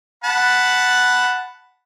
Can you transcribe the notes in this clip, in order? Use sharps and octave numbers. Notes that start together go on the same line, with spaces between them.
F#5 A5 B5